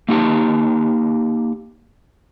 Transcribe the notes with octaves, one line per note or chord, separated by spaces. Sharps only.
A#3 D#4 G4 F#5 A5